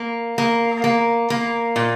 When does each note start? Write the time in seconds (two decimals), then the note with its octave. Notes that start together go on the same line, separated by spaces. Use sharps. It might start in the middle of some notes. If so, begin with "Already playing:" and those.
Already playing: A#3
0.38 A#3
0.84 A#3
1.30 A#3
1.76 A#2